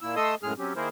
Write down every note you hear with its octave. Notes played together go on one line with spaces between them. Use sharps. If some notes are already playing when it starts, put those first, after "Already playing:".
A#2 A#3 E4 E6
A3 A4 D#5 C6 D#6 E6
F#2 A2 G#3 G#4 F6
F#3 C4 C#4 G4
D#3 A#3 E4 G#4 A#4 C5